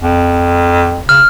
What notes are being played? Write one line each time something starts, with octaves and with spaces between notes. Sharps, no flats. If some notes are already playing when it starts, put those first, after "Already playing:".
F2
C#3 F6